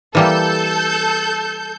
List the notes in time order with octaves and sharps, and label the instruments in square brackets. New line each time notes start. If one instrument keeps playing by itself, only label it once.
[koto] E3 G3 A#3 [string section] A4 G6